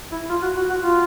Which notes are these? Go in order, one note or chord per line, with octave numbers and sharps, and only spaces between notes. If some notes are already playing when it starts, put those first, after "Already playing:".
E4
F4
F#4
F#4
F#4
F4